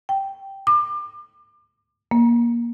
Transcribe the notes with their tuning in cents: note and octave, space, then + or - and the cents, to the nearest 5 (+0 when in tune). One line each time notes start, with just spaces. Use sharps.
G5 -5
D6 +35
A#3 +20